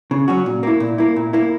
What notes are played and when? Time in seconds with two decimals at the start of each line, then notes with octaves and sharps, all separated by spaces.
0.11 C#3
0.28 F#3 C#4 F#4
0.46 A#2
0.63 A#3 E4
0.80 A#2
0.98 A#3 E4
1.16 A#2
1.33 A#3 E4